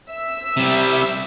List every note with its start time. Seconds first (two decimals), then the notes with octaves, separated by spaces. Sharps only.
0.12 E5 E6
0.57 C3 G3